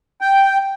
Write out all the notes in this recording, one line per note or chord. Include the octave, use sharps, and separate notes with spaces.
G5